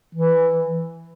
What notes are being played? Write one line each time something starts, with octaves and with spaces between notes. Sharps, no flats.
E3